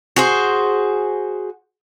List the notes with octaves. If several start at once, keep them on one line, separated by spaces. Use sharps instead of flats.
F#4 G#4 C5